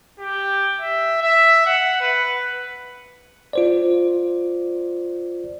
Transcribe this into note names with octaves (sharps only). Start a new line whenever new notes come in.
G4
E5
E5
F#5
B4
F4 C5 D5